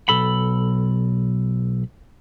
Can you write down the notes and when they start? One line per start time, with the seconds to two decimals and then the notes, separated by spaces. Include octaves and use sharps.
0.09 B1 A4 B5